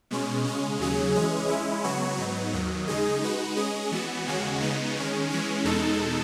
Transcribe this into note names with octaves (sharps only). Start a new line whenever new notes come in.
B2 G#3 C#4
C#3 G#3 C#4
D#2 C#3 F#3 C#4 G#4
E3 G#3 C#4 G#4
G#3 C#4 E4
C#3 F#3 B3 F#4 C#5
G#2 F#3 B3 D#4
D#2 D#3 F#3
C#3 G#3 D#4 G#4 D#5
G#3 D#4 F#4 B4
G#3 C#4 G#4 D#5
E3 B3 F#4
D#2 C#3 G#3 C#4 F#4
C#3 G#3 B3 D#4
D#3 G#3 C#4
E3 G#3 C#4
E2 B2 G#3 D#4 A4